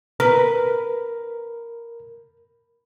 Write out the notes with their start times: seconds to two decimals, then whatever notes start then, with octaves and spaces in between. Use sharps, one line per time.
0.20 A#4 B4